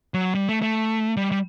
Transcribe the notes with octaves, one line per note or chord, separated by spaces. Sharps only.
F#3
G3
A3
A3
G3
G3